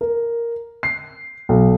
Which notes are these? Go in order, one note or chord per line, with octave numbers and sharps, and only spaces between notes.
A#4
C7
B1